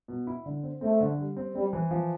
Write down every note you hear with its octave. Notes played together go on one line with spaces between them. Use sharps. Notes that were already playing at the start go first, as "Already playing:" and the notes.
B2
E4
D3
C4
A3 C4
D3
G3
C4
G3 C4
E3
F3